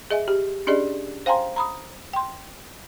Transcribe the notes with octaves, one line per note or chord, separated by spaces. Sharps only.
G#4 D#5 E5 G#5
G4
C#4 D4 G4 G#4 D5 D#5
C5 F5 G5 G#5 A#5 C6
A#5 B5 D#6
G5 C6